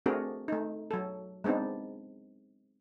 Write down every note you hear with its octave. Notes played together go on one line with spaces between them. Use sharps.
A3 C4 D4 F#4 G#4 A#4
A3 D#4
F#3 A4
G#3 B3 C4 D4 D#4